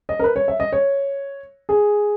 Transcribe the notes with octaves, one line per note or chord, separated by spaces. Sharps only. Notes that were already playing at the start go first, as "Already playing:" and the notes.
D#5
A#4
B4
C#5
E5
D#5
C#5
G#4